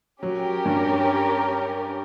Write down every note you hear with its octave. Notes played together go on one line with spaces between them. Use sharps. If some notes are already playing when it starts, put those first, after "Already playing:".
F#3 C#4 G4 A#4
G2